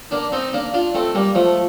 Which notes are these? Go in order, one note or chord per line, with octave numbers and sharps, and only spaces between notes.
A#3 D4
C4 D#4
A#3 D4
D4 F4
A3 C4
G3 A#3
F3 A3